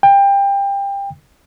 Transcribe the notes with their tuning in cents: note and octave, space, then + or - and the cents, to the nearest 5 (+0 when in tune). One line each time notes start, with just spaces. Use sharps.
G5 +25